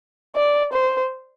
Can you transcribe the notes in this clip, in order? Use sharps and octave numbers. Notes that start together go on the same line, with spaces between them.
D5
C5